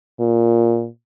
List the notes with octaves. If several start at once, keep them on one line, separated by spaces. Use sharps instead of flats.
A#2